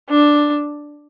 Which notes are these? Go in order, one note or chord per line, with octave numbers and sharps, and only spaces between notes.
D4